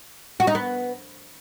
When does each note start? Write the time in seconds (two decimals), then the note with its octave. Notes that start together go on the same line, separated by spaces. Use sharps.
0.40 F#4
0.47 D#4
0.55 B3